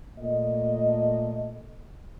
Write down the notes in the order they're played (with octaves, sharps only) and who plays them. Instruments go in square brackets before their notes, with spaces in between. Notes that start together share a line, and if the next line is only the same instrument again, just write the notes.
[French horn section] A#2 A3 D#5